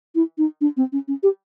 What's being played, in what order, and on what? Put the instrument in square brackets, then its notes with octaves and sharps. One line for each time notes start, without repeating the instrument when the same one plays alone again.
[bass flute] E4
D#4
D4
C4
C#4
C#4
G4